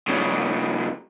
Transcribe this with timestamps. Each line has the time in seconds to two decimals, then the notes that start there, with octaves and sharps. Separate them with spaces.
0.08 G2 C#3